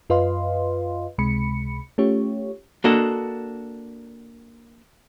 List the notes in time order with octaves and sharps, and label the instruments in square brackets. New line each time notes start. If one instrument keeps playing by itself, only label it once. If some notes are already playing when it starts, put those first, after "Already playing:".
[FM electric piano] F#2 F4 B4 D#5 F5 C6
C#2 C3 G#3 B5 C#7
A3 C#4 F4 G4 C#5
[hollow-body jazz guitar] A#3 D4 F#4 A4 D#5